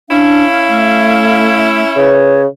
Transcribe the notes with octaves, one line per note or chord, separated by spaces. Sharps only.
C#4 D4 E4 F5
A3
C#3 B4 C#5